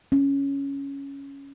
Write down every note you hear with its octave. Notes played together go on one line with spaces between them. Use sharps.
C#4